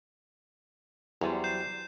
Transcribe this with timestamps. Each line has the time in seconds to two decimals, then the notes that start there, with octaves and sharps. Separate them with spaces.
1.21 E2 F#3 G3 C5
1.44 G6 C7 E7